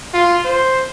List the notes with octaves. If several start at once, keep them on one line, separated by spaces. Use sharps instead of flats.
F4
C5